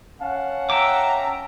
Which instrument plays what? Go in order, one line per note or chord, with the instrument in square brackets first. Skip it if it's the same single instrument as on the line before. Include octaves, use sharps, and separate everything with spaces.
[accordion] C#4 F5 A5 [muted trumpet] F#5
[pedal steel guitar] E5 G5 D6 [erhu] A#5